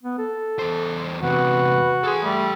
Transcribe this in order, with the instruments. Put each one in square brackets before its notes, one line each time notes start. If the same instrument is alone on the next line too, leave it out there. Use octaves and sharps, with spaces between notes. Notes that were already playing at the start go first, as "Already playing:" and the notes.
[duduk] B3
A4
[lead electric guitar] E2 C5
[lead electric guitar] E2 C3 [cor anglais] F#4 [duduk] B4
[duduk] G#4 [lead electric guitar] A4 C6
[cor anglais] G3 [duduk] A3